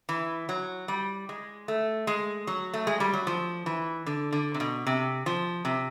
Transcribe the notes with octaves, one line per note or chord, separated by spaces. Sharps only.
E3
F#3
G3
G#3
A3
G#3
F#3
A3
G#3
G3
F#3
F3
E3
D3
D3
C3
B2
C3
F3
C3